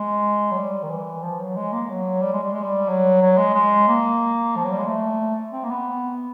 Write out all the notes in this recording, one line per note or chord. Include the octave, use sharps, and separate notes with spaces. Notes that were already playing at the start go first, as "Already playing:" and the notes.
Already playing: G#3
F#3
G3
D#3
E3
F3
F#3
G#3
A#3
F#3
G3
G#3
G3
G#3
G3
F#3
F#3
G#3
G#3
A#3
F3
F#3
G3
G#3
A3
C4
A#3
B3